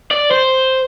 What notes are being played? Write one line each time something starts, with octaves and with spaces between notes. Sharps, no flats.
D5
C5